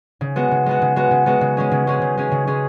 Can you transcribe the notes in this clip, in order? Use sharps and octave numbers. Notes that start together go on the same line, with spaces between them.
C#3
G#3 B3 F#4
C#3
G#3 B3 F#4
C#3
G#3 B3 F#4
C#3
G#3 B3 F#4
C#3
G#3 C#4 G#4
C#3
G#3 C#4 G#4
C#3
G#3 C#4 G#4
C#3
G#3 C#4 G#4